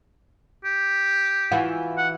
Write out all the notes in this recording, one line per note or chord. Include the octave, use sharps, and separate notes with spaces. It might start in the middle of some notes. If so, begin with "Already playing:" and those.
G4
E3 F4 F#4
F#5